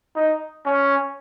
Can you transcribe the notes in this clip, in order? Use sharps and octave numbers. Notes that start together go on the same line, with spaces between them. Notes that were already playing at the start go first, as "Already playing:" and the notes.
D#4
C#4